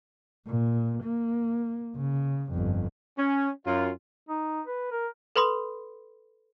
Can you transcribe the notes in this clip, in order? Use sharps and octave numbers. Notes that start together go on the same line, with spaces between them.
A#2
A#3
C#3
G1 F2
C#4
F#2 F4
D#4
B4
A#4
A4 B4 B5 C6 D#6